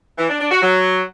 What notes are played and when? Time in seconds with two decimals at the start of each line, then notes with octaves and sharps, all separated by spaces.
0.19 E3
0.29 D4
0.40 D4
0.51 F#4
0.61 F#3